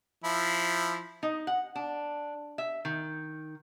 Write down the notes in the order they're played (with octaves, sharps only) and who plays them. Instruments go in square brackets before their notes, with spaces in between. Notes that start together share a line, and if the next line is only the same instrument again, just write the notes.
[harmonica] F3 E4
[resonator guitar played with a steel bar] D#4
F#5
D4
E5
D#3